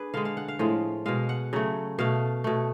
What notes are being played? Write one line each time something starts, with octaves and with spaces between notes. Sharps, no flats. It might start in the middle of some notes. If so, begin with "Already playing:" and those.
Already playing: D4 G#4 B4
D3 G#3 F5
F5
F#5
F5
A2 F3 G#3
B2 G#3 F5
F#5
C#3 F#3 A3
B2 A3 F5
B2 A3